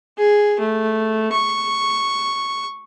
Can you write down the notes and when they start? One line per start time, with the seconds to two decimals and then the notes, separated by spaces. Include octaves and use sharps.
0.18 G#4
0.60 A3
1.32 C#6